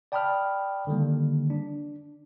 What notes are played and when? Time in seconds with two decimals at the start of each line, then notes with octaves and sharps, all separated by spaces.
0.12 D5 G5 A5 B5 D#6 F6
0.87 D3 D#3 G3 A#3
1.50 D4